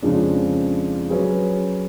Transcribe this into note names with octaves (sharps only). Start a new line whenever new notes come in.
F2 C#3 F3 G#3 D4
F#3 C#4 G#4 B4